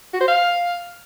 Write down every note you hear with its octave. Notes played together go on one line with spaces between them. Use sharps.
F#4
C5
F5